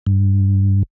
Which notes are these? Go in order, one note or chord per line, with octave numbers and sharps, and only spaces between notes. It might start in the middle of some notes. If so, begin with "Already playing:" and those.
G2